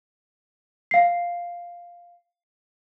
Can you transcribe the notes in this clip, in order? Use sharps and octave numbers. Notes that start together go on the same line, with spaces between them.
F5 C7